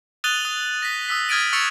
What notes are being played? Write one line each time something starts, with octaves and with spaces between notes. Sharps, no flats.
D#6 F#6 A6 D#7 F7 G7
D#6
A#6 B6
D#6 E6 B6
D#6 F6 G#6 A6 D7 D#7
C#6 E6 A6 C#7 F7